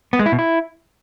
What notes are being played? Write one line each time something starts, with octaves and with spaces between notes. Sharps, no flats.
B3
G#3
E4
B2
E4